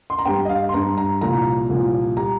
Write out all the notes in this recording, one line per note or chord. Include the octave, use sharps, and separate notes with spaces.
C6
A#5
G2 G3 G5
D#5
F5
C6
G2 G3 A#5
A#5
C2 A#2 F3 A#5
C2 A#2 F3
G3 A#5